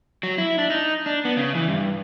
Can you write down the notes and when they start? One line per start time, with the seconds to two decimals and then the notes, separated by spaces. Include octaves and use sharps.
0.23 F#3
0.38 E4
0.58 D4
0.70 D#4
1.06 D4
1.25 B3
1.37 C#3
1.55 E3
1.68 G2